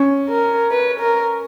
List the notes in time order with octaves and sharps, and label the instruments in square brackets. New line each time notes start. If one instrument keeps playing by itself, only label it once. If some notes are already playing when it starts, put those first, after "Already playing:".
Already playing: [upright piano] C#4
[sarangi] A#4
B4
A#4